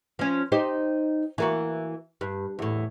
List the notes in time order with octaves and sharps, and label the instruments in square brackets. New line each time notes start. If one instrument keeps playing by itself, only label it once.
[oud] F3 C#4
D#4 G4 C5
E3 A#3 F#4
G2
E2 A2